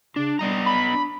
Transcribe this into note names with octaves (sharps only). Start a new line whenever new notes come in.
C#3 D4
G3 B3 D#5 A#5
B5
D4